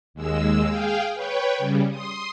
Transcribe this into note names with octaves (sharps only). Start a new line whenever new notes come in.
D#2 G#3 E6
G#4 F5 G5
B4 C#5 G5
C#3 G3
C6 D#6